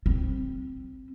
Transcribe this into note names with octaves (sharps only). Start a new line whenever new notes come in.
C4